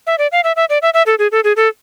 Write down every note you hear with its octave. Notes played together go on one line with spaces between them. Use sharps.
E5
D5
F5
E5
E5
D5
E5
E5
A4
G#4
A4
G#4
A4